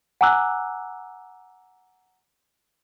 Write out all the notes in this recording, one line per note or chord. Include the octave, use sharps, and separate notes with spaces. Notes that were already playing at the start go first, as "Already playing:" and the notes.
F#5 G#5 A#5 D6 E6 F#6